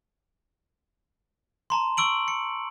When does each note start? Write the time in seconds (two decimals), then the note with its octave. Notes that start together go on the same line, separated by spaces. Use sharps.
1.70 A5 A#5 C6
1.97 C#6 E6 D7 F#7
2.28 C#7